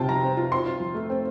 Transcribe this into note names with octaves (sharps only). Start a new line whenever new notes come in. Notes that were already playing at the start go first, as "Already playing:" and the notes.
Already playing: C3 C4 F4 G5 A5
F3 A#5
C4
F4
C4 C6
F4
F3
A3
C4